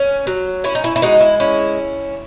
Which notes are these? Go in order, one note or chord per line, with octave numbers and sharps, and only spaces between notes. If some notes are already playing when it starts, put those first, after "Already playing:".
Already playing: C#4
F#3
C#4 E4
D#4
E4
E4
G#3 D#4 F#4
E4
C#4 E4